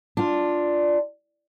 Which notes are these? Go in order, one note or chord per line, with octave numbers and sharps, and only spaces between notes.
D4 F4